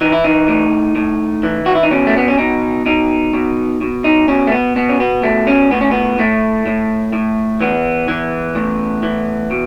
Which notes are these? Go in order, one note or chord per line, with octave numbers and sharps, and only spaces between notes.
E3 D#4
E4
D#4
A2
A2
E3
F#4
E4
D#4
B2 C#4
A3
B3
C#4
B2 D#4
B2 D#4
B2
B2
D#4
B2 C#4
A3
B3
B2 B3
C#4
B3
B2 A3
C#4
A2 B3
C#4
B3
A2 A3
A2
A2
E3 B3
E3
A2
E3
B2